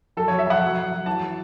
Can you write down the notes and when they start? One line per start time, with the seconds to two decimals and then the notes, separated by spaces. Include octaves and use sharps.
0.17 F#3 A4
0.28 C#5
0.32 F#3
0.39 E5
0.47 F#3 F#5
0.61 F#3
0.77 F#3
0.92 F#3
1.06 E3 A5
1.21 E3